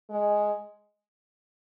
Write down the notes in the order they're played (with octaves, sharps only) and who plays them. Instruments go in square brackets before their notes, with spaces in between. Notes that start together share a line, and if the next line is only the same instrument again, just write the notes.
[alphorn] G#3